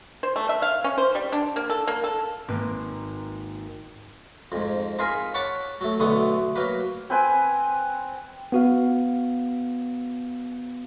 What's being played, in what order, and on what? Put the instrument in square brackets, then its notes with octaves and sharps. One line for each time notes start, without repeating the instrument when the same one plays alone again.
[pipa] C5
A3
E5
F5
C#4
C5
G3
D4
A#3
A4
A#3
A4
[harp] G#1 A#3 B4 C6
[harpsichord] F2 G#2
D#4 F4 G#4 A#4 G#5 B5
C#5 F#5 A5 B5 D6
F#3 A3
B1 D3 A3 B3 D#6
F#3 A#3 B4
[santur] C4 B4 G5 G#5
[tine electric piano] B3 F#4 F5